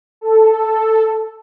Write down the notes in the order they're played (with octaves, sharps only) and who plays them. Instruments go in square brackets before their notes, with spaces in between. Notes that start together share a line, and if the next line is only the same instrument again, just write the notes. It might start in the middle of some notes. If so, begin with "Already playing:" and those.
[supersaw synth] A4